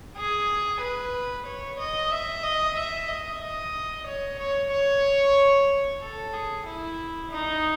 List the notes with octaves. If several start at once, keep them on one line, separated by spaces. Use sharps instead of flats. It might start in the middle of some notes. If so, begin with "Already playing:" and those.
G#4
B4
C#5
D#5
E5
D#5
E5
D#5
D#5
C#5
C#5
C#5
A4
G#4
E4
D#4